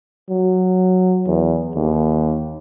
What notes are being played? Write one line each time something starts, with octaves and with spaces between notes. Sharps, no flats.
F#3
E2
D#2